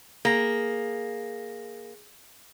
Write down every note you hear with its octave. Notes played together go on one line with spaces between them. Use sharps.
A#3 G#4 A#6